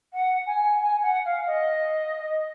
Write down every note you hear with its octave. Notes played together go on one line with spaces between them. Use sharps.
F#5
G#5
G#5
F#5
F5
D#5